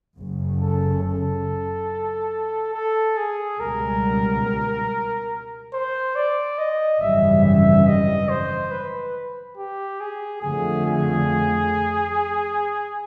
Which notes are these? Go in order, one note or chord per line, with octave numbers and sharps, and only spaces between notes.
F#1 F#2 C#3
A4
A4
A4
G#4
C#2 B2 G3 A#4
C5
D5
D#5
G#1 F#2 C#3 E3 G3 E5
E5
D#5
C5
B4
G4
G#4
F2 D3 F3 A3 G#4
G#4